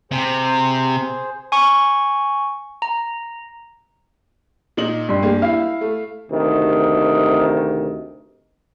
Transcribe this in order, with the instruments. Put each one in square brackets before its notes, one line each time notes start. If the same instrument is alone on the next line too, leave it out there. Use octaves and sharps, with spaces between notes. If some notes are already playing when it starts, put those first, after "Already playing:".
[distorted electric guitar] C3 [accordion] G#4 C5
[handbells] G#5 C#6
A#5
[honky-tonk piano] A#2 D#4 F#7
[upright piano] G2 C6
[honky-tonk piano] A#3 G4 G#4
[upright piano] E4 F5
[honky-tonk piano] A3
[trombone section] D2 C3 D#3